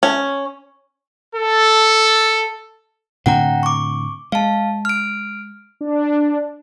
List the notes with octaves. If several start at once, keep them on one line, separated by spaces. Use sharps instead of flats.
C#4
A4
A2 D3 C4 F#5 G5 A#5
C#6 D6
G#3 F5 A5
F6 D7
D4